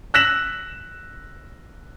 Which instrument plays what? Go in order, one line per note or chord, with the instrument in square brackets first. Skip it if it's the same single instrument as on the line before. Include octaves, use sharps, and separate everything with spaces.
[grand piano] E6 F#6 A#6 B6 E7 F#7